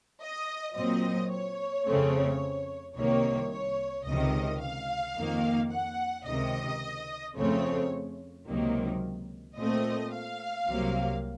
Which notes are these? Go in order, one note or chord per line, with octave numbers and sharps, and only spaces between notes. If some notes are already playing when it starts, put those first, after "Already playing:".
D#5
A#2 F#3 C4 D#5
C#5
F2 C#3 A3 C4
C2 C3 D#3 A#3 C#5
C#5
C#2 C3 D#3 D#5
F5
F2 D#3 A#3
F#5
C#2 C3 D#3 D#5
F2 C#3 A3 C4 C#5
C#2 C3 D#3 F#3 A#3
A#2 A3 C4 D#5
F5
C2 C3 F#3 A#3